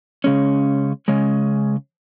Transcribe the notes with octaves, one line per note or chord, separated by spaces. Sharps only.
C#3 G#3 C#4
C#3 G#3 C#4